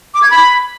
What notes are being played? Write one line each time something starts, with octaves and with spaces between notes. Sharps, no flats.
D6
G#6
B5